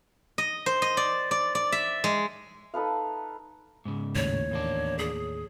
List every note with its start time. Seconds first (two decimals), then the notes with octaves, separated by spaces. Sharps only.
0.38 D#5
0.66 C5
0.82 D#5
0.97 D5
1.31 D5
1.55 D5
1.72 E5
2.04 G#3
2.74 D#4 A4 B4 F5
3.85 G#2 C#3
4.15 D#2 A2 C#5
4.51 E2 A#3 D4
4.99 G#4